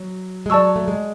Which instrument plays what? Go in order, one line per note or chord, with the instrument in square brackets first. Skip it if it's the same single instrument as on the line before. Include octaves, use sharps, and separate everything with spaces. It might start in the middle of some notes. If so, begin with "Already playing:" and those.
Already playing: [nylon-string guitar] F#3
G#3
[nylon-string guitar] F#3 [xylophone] D5 A5 C#6 E6
[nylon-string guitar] A3
G#3